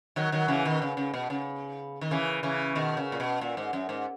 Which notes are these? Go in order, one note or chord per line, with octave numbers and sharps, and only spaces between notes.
D#3 F#3
D#3 F#3
C#3 E3
B2 D#3
C#3
C#3
B2
C#3
D#3
C#3 E3
C#3 E3
B2 D#3
C#3
A#2
B2
A#2
G#2
F#2
G#2